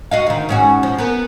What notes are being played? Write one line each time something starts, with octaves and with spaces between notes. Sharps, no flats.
F#4 D#5 F5
D2 D#3
G#2 C#4 F#4
F3
B3 A#4